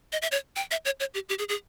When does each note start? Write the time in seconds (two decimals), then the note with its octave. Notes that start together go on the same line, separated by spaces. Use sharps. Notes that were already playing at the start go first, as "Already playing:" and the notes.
0.12 D#5
0.22 E5
0.32 C#5
0.56 G5
0.71 E5
0.85 C#5
1.00 C#5
1.14 G4
1.29 G4
1.39 G#4
1.49 G#4